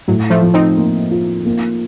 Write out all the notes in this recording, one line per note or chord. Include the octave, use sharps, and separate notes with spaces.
A2 F#3
F3 A3
F3
C4 D#4
A#3
F4
A#3